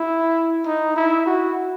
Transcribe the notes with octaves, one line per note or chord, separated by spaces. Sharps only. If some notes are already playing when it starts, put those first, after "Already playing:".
Already playing: E4
D#4
E4
F#4